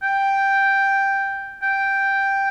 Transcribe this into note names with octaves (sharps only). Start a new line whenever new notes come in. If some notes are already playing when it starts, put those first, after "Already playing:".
G5
G5